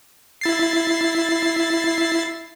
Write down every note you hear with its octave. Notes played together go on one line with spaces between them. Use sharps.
E4 A6 C7